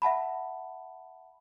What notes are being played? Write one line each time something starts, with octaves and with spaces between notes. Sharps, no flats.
E5 F#5 A5 B5